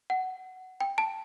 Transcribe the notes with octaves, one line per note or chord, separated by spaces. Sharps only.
F#5
G5
A5